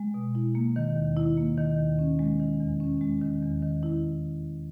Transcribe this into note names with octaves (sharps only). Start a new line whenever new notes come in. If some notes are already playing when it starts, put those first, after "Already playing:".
Already playing: G#3
B2
E4
A#3
D#3
D#2
E4
A#3
D#3
D#2
C#4
G#3
D#3
E2
C#4
G#3
D#3
E2
D#3
E4